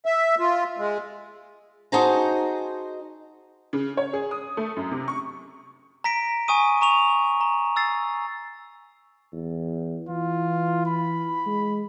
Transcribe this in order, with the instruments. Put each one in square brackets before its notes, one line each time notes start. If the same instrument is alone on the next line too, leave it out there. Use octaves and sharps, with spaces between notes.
[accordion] E5
F4
G#3
[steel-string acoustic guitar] D#4 F#4 G#4 C5 A5 A#5
[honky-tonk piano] C#3
C#5
G#4
D#6
A3
F#2
C3
C#6
[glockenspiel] A#5 A#6 B6 D7
G#5 C#6 D#6 D#7
A#5 C#6 F7
A#5
E6 A6 C7
[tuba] E2
[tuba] E3 [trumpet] F4
[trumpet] B5
[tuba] G#3